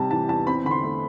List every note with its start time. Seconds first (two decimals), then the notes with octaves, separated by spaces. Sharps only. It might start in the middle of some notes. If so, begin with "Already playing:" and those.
Already playing: C3 G3 A5
0.11 E3 A5
0.28 E2 A5
0.47 C4 B5
0.65 D3 B5
0.71 C6
0.83 A3